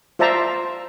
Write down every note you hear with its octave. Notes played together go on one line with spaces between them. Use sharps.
F4 C5 D5 E5 A5 A#5